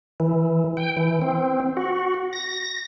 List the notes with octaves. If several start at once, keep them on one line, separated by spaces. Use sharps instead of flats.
E3
G5
E3
C4
F#4
A#6